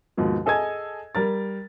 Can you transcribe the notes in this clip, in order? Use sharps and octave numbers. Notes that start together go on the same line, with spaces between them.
D#2 G#2 B2 F3
G#4 A4 D#5 G#5 G#6
G3 A#4 A6